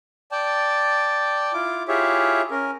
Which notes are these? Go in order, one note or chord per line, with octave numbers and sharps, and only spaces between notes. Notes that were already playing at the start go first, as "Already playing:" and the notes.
D5 G5 A5
E4 F4 D6
E4 F4 G4 G#4 C#5 E5
C#4 A#4